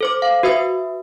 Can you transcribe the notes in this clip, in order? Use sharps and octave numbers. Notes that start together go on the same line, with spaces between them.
A4 C5 D6
F5
F#4 B4 E5 D#6